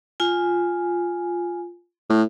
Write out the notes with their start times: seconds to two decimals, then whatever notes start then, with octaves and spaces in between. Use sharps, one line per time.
0.20 F4 G#5
2.10 A2